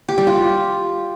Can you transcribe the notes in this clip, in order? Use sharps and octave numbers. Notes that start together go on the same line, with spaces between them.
G4
G3
F4